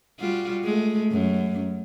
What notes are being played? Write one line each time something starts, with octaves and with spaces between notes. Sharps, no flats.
G3 F4 F#4
G#3 A3
F#2